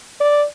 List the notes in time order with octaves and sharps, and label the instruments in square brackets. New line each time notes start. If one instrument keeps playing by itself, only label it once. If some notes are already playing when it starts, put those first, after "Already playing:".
[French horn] D5